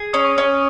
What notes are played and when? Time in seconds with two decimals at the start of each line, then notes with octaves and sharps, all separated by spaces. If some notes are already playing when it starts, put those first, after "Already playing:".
Already playing: G#4
0.13 C#4 D#6
0.25 C#6
0.37 C#4 D#6